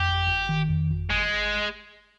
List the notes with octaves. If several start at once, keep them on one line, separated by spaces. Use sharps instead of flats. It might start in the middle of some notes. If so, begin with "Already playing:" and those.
Already playing: F2 G4
G1
G1
D#3
F2
G1
G#1 G#3